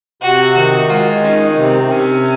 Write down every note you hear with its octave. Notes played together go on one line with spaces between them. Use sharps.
C3 F#4
D#3 F#4
G#3 F4
D#3 C#4
C3 C4
C3 C#4